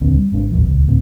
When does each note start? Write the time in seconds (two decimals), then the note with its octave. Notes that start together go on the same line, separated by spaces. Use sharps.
0.01 D#1 C#2 D3 C4
0.16 G3
0.32 G#1 G#2 D4
0.51 A1 D#2 B2 F3
0.67 D#1 C#2
0.88 D2 A2 C4